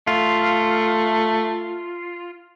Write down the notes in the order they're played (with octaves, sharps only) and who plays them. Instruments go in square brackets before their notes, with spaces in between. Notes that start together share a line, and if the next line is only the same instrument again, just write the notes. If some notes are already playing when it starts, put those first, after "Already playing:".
[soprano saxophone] A3 [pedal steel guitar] F4